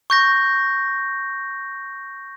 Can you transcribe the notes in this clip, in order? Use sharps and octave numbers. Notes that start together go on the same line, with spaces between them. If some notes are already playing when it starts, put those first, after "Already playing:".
C#6 G6 A#6